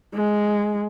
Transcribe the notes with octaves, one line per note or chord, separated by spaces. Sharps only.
G#3